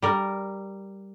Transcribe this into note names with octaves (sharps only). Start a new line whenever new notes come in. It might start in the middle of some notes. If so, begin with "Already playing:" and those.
G3 A#4